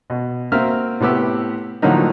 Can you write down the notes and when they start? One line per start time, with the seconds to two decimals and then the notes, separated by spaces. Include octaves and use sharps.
0.10 B2
0.52 A#3 C4 F#4 E5 F6
1.00 A2 C3 B3 G4 E6
1.82 A2 D3 F3 F#3 A#3 D#4